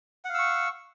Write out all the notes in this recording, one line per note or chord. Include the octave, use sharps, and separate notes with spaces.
F5 F#5 C#6 E6